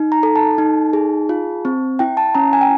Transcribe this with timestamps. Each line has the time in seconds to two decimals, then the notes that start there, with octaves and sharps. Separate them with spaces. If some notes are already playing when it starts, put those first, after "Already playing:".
Already playing: D#4
0.12 A#5
0.23 A4
0.36 A5
0.58 D#4
0.93 G#4
1.29 F4
1.65 C4
1.99 E4 G5
2.17 A5
2.35 C#4 A#5
2.53 G#5
2.61 G5